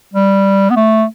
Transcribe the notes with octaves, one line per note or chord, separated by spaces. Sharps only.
G3
B3
A3